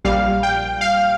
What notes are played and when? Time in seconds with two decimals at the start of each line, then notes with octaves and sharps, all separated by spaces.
0.04 A#1 A#2 G3 F5
0.43 G5
0.81 F5